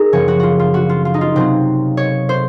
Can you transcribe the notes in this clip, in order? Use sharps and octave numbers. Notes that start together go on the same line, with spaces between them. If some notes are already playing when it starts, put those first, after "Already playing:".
Already playing: D#4 G#4 A#4
F#2 C#3 F3 C4 C#5
F#4
F4 F#4
F4
F#4
F4
F4
D#4
F4
C3 F#3 C4 C5
C#5
C5